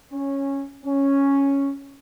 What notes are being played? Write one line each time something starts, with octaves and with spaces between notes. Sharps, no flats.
C#4
C#4